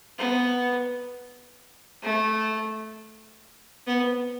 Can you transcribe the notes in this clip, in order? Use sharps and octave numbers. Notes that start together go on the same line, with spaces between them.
B3
A3
B3